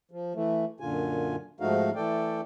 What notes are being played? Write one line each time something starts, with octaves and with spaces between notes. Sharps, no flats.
F3
E3 A3
F#2 A#2 D3 F4 G#5
G#2 F3 A3 D#4 F#4 F5
E3 A3 A4 D5 G5